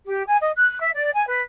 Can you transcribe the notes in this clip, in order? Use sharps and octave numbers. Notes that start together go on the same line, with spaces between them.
G4
G#5
D#5
F#6
E5
D5
G#5
B4